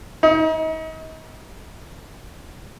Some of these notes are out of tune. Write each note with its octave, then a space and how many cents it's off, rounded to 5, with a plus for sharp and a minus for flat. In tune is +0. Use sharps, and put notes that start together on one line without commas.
D#4 +35